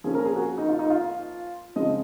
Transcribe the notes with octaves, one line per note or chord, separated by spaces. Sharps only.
F3 A#3 C#4 G#4
A#4
G#4
F#4
D#4
F4
D#4
F4
C#3 F3 G#3 C4 D#5